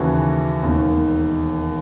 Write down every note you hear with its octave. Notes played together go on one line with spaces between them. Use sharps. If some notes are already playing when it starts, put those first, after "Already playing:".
Already playing: D#2 C#3 E3 F#4 A4
E1 D#2 D#3